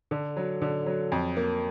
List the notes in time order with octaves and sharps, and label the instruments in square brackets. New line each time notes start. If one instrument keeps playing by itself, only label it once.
[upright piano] D3
F#3
D3
F#3
F2
A#3